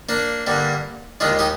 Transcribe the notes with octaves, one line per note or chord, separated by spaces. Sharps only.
A#3 D4
G2 D3 G3 A#3
D#2 D#3 G#3 D4 F4
D#4 G4